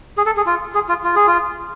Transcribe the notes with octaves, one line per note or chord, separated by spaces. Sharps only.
G#4
A4
G#4
F4
G#4
F4
F4
G#4
F4